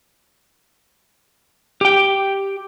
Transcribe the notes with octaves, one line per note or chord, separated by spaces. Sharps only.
G4 G5